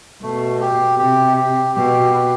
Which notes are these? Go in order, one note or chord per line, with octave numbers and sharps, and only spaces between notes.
B2 A3
G4
C3 G4
G4
B2 G4
B4